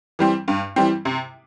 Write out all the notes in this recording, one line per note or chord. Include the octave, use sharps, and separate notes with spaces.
E3 G3 C4
G2
E3 G3 C4
C3